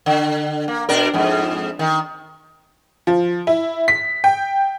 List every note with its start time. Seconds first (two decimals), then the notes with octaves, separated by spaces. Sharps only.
0.06 D3
0.68 A#3
0.89 B2 D4 A#4
1.14 F2 G#2
1.79 D#3
3.07 F3
3.47 E4
3.88 B6
4.24 G5